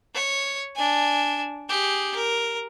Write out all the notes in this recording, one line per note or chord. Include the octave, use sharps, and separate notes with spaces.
C#5
D4 G#5
G4 G#4
A#4